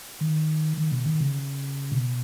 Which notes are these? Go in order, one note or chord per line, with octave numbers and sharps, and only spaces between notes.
D#3
D#3
B2
D#3
C#3
B2